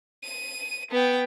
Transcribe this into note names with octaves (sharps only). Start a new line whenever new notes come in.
D#7
B3 G5